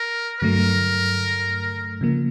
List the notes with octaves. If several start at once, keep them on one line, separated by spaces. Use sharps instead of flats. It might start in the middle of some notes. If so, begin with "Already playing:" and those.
Already playing: A#4
G2 D3 F#3 A3 A#4
C#3 F3 A#3